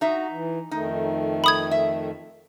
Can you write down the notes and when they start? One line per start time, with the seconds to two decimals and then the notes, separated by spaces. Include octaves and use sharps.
0.01 D#4 F#4 E5
0.31 E3
0.71 F2 D#3 A3 D#4
1.44 B5 D#6 G#6
1.71 E5